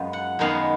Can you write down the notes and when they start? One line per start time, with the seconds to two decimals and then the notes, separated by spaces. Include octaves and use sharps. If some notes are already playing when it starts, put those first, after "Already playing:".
Already playing: F#2 F3 G#3 B3
0.13 F#5
0.39 F#2 D#3 G#3 B3 F5